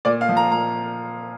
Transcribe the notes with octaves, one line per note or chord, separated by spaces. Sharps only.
A#2 D5
F5
F3
A#5
A#2 A#5